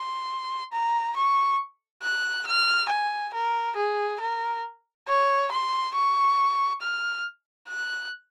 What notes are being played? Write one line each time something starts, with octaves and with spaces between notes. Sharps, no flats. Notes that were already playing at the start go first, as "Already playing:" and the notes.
Already playing: C6
A#5
C#6
F#6
F6
G#5
A#4
G#4
A#4
C#5
C6
C#6
F6
F#6